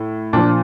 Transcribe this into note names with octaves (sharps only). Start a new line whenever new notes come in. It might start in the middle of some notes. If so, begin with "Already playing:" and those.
Already playing: A2
A#2 F3 D4